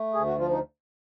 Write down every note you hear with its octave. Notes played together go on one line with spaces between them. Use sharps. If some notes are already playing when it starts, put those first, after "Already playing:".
Already playing: A3
D2 G#4
F#4
F3 F4
D#4